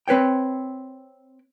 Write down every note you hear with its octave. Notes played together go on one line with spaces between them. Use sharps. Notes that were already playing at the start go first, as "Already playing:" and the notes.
C4 B4 C#5 G5